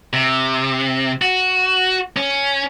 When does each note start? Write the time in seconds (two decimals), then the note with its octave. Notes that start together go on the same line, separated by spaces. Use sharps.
0.13 C3
1.22 F#4
2.16 C#4